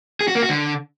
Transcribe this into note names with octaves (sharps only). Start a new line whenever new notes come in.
G#4
F#4
A#3
F#4
D3